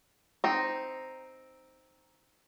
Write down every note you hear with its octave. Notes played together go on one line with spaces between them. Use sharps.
C4 D#4